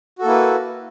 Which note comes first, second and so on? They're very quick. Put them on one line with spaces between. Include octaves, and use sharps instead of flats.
F#4 A4 A#3 E4 B4